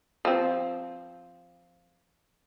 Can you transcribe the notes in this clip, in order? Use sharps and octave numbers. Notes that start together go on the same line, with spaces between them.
F3 C4